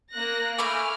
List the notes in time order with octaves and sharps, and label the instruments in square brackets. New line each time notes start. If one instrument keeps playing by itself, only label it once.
[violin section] A#3 F#6 A#6
[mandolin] A3 B5 D6 [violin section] G#5 F6